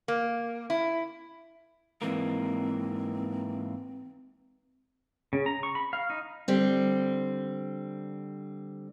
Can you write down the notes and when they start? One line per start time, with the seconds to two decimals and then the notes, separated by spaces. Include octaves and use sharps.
0.08 A#3
0.70 E4
2.02 G#2 E3 A#3 C4
5.33 C#3
5.46 A#5
5.63 C#6
5.75 B5
5.93 F5
6.10 D#4
6.48 D3 G3 C4